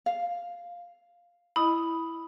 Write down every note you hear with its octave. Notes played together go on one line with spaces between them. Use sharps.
F5
E4 D#5 B5 D#6